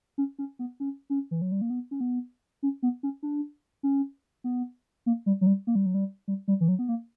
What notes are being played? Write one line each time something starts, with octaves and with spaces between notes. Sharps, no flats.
C#4
C#4
B3
C#4
C#4
E3
F#3
G3
A#3
B3
C#4
B3
C#4
B3
C#4
D4
C#4
B3
A#3
G3
F#3
G3
A#3
G3
F#3
G3
G3
G3
E3
F#3
B3
A#3